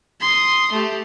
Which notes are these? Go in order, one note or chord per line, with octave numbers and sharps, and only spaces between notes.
C6 D#6
A3 G4